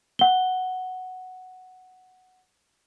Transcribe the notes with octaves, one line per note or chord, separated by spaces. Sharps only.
F#5 G7